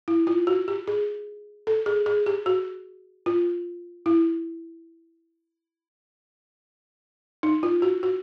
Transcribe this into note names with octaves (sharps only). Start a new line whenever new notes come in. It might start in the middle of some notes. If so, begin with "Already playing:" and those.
E4
F4
F#4
G4
G#4
A4
G#4
G#4
G4
F#4
F4
E4
D#4
F4
F#4
F#4